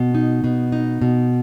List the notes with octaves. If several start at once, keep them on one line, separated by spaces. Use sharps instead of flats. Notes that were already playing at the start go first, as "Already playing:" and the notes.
Already playing: B2
D#4
B2
D#4
B2